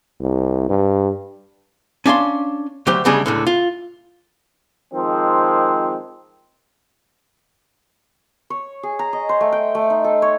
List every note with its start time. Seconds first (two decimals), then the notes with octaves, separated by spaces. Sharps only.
0.20 C2
0.69 G2
2.06 C#4 D4 F5 C6
2.87 D2 F#3 G4 C5 G5
3.05 D2 C#3 G3 G#3 D4 G#4
3.26 C#2 A2 D3
3.47 F4
4.94 D#3 F3 G#3 C4
8.50 C#5
8.83 G#4
8.99 A#5
9.13 D#5
9.29 C5
9.41 A3
9.52 G5
9.75 A3
9.90 D#4
10.04 A4
10.22 C#5